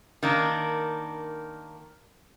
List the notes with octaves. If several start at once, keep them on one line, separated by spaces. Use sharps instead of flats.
D#3 A#3 D4